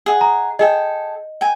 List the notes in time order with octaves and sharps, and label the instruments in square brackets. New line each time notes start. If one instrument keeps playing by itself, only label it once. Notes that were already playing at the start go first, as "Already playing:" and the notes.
[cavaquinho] G#4 D#5 F#5
[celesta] A#5
[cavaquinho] G#4 A4 G5 [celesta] D#5
[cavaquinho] G5 G#5